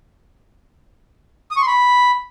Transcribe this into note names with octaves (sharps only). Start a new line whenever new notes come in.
D#6
C#6
C6
B5